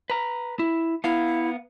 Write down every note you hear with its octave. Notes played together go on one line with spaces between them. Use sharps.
B4 A#5
E4
B3 E4 F5